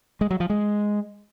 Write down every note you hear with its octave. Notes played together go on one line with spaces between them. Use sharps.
G#3
F#3
F3
G#3